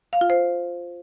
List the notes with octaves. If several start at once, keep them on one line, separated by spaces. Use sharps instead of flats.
F5
F4
C5